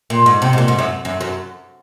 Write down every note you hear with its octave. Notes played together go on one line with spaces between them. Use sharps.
A#2
G#2
C3
G#2
A#2
G#2
F#2
F#2
F#2